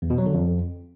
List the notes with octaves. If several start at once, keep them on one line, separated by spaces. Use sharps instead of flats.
E2
B2
F#3
D3
F2